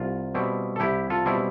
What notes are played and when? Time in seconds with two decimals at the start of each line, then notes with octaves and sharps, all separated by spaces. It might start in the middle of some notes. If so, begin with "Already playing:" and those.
Already playing: C2 F4
0.35 B2 G3 C4 E4
0.76 A4
0.80 C2 E4 G4
1.10 F4 A4
1.25 B2 G3 C4 E4